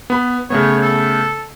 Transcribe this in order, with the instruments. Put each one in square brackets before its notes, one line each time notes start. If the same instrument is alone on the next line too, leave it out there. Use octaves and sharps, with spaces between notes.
[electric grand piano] B3 B5
[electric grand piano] C#3 A3 B3 [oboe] C#5
[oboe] A4